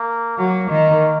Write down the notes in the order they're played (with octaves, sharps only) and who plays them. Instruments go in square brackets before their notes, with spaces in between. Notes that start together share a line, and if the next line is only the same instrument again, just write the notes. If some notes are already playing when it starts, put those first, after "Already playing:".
Already playing: [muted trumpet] A#3
[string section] F#3 [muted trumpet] A#3
[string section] D#3